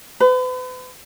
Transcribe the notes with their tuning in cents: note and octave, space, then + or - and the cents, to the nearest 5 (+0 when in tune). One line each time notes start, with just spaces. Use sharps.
B4 +40